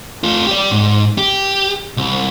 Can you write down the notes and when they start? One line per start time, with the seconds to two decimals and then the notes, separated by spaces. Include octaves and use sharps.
0.23 A3 F4
0.47 G4 D5
0.70 G#2
1.18 G4
1.97 C2